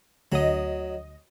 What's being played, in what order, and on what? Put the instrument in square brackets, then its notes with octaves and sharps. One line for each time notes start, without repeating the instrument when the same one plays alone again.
[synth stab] D2 D#5 [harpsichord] F#3